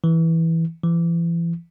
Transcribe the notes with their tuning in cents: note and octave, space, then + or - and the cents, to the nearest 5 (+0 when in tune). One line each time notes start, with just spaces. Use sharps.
E3 -10
E3 +35